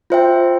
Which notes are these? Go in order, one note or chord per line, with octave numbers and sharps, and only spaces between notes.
F4 C5 E5 G5